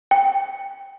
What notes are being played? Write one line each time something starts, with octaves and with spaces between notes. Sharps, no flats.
G5